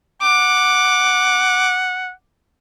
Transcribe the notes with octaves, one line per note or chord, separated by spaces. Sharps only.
F#5 D6